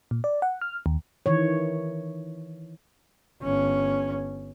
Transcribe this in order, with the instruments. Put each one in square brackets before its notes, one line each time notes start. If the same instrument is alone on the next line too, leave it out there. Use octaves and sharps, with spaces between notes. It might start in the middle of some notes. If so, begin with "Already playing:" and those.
[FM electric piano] A#2
D5
F#5
F6
D#2
[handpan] D#3 E3 C#5
[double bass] G1 C#4